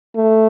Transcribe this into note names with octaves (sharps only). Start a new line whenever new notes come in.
A3